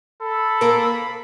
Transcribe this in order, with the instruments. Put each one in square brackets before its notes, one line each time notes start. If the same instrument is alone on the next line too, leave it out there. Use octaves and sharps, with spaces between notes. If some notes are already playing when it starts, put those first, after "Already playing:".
[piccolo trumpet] A4 [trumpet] B5
[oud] A#3 A#4